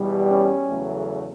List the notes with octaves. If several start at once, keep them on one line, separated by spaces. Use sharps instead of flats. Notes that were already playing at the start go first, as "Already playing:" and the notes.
Already playing: E2 B2 G3
C#4
E2 C#3 F#3 A3